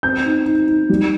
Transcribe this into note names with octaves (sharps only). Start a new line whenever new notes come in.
C4 G6
D#4
D#4
D#4
G3